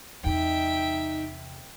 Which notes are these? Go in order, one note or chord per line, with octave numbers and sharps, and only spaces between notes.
E2 C3 D#4 E5 G5